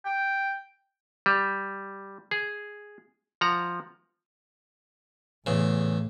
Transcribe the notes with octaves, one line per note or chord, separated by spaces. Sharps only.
G5
G3
G#4
F3 F#5 A#5
E2 A2 C#3